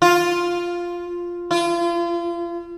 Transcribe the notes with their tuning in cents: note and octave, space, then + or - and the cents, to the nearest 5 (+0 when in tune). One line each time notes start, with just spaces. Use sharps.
F4 +0
F4 -35